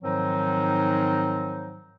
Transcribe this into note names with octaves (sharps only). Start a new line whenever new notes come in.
G#2 D#3 F3 F#3 C4 D#4